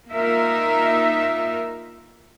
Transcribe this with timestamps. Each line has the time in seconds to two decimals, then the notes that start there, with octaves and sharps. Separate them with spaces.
0.12 A#3 D#4 F4 A#4 E5